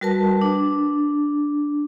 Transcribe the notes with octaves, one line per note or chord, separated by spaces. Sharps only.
G3 F#4 A#4 B4 A5
D4